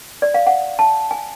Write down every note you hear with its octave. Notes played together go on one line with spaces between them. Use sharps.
D5
F5
F#5
A5
G#5